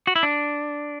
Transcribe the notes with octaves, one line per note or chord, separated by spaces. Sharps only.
F#4
E4
D4